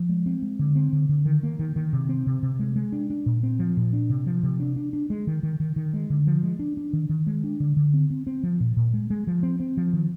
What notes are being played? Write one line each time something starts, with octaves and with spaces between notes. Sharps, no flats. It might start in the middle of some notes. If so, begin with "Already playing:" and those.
Already playing: F3
G#3
C4
G#3
D3
C4
D3
D3
D#3
A#3
D#3
D#3
C3
C4
C3
C3
G#3
G#3
D4
D4
A#2
C4
F3
A#2
D4
C3
F3
C3
D4
D4
D4
G#3
D#3
D#3
D#3
D#3
G#3
D3
F3
G#3
D4
D4
D#3
D#3
G#3
D4
D3
D3
C4
C4
C4
F3
A#2
A#2
G#3
G#3
F3
C4
C4
F3
D#3